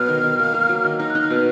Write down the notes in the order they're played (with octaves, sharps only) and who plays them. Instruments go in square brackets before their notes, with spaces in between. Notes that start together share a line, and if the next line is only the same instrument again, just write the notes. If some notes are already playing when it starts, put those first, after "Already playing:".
Already playing: [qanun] B2 F#3 B3 [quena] F6
[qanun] D#3
D#3
A#3
A#3
F#3
D#3
[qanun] D#4 [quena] F6
[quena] F#6
[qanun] D#4
[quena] F6
[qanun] B2